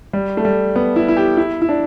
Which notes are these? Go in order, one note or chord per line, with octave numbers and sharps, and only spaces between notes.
G3
A3
G3
B3
E4
E4
G4
E4
E4
D4